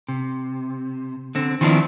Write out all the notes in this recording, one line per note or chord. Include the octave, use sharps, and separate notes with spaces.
C3
D3 C4
D#3 F3 B3 C4 D4 E4